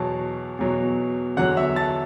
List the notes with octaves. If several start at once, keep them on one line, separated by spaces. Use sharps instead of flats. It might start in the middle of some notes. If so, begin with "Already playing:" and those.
Already playing: E2 B2 F#3 A5
E2 B2 F#3
E2 D3 F#3 F#5 F#6
E5 E6
A5 A6